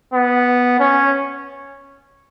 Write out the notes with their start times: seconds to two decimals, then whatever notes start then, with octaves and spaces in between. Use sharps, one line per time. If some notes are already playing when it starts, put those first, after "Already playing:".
0.13 B3
0.79 C#4